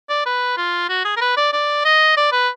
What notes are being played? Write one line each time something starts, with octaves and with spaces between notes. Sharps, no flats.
D5
B4
F4
F#4
G#4
A#4
B4
D5
D5
D#5
D5
B4